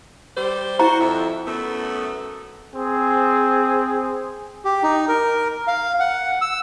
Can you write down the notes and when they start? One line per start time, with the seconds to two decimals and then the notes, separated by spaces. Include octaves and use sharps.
0.37 G3 C5
0.79 E4 F#4 C5 A#5
1.01 F2 E5
1.47 F#2 A3 B3
2.74 C4 G#4
4.65 G4
4.83 D#4
5.08 A#4
5.67 F5
6.00 F#5
6.41 E6